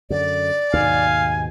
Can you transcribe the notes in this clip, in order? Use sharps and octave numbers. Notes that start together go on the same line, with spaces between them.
F#2 D3 D5
D#2 G#2 B2 F5 G#5